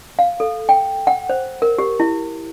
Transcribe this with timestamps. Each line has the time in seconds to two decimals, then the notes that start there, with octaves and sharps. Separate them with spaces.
0.19 F5
0.40 A4
0.69 G5
1.07 F#5
1.29 C5
1.62 A#4
1.78 G4
2.00 E4